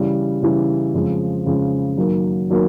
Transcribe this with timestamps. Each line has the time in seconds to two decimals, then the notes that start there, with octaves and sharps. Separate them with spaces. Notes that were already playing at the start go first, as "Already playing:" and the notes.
Already playing: C#3 E3 G3
0.42 C#3 E3 G3
0.94 F2 C#3 F3 G#3
1.46 F2 C#3 F3 G#3
1.97 F#2 D#3 F#3 A#3
2.50 D#3 F#3 A#3